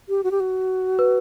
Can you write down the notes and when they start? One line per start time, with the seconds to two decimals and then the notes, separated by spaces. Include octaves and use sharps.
0.09 G4
0.24 F#4
0.31 G4
0.40 F#4
0.99 B4